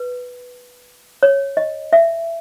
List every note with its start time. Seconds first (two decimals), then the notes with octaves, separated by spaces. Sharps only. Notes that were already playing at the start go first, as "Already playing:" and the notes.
Already playing: B4
1.23 C#5
1.57 D#5
1.93 E5